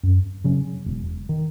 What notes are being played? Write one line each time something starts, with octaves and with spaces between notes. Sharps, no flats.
F#2
C#3 F#3 C#4
E1
D#3